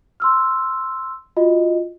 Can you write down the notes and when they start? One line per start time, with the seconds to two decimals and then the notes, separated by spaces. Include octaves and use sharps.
0.20 C6 E6 F6
1.37 F4 F#4 D#5